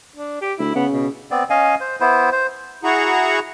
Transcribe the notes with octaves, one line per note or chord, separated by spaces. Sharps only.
D4
G4
D2 E4
C#3 B3
B2
B3 C4 D5
C#4 D#5 F5 G#5
C5
B3 E4 C5
C5
E4 F#4 G#4 F#5 A#5 C#6